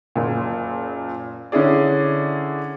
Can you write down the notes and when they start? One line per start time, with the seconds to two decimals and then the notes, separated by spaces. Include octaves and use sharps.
0.16 F#1 A#2
1.52 D3 C#4 E4 G#4 D5